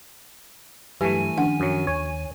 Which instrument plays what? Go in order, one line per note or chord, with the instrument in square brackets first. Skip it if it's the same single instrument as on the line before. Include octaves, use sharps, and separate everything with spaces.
[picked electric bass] G2 F#3 [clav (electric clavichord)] E3 A3 [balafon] G4 [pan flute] G#5
[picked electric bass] D#3 F3 C#4 [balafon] D4 F#5
[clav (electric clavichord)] F#2 F#3
[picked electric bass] D#2 [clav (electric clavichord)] C#5